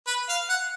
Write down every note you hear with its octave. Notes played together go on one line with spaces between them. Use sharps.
B4
F5
F#5